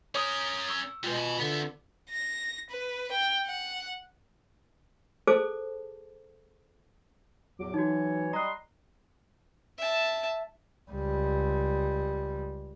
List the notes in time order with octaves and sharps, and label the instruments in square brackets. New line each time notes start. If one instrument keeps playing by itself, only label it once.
[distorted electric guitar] C#4 A#4 [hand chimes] C#5 D6 D#6
[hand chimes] C#6 E6
[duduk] B2 [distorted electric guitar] G3 G#3 [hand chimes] F4 B4
[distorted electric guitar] G#5 B5
[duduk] D3 [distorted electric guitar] B3 E5
[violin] A#6
B4
G5
F#5
[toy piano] G#4 A4 C5 A5 D6
[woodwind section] E2 A2 D6 [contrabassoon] F#3
[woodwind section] E3 C#5 [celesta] D#4 F#4
[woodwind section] G3 D#5 C6 [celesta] A#5 F#6
[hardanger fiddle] E5 A5
[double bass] C#2 G3